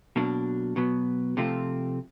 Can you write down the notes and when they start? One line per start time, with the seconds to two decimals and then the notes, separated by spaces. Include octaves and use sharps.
0.16 B2 F#3 A#3 D4
0.76 B2 F#3 B3
1.37 C3 F3 A3 C4 F4